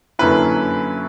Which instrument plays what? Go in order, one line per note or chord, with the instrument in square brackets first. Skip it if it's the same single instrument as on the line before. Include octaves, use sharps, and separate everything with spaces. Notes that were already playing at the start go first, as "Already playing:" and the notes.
[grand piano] F#2 D3 A#3 C#4 E4 B4